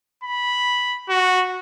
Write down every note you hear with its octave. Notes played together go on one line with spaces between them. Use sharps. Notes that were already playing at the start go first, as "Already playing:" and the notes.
B5
F#4